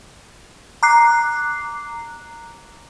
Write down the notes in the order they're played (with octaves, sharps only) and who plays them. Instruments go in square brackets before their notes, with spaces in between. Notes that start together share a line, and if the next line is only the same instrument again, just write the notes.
[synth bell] A#5 D6 F#6 C7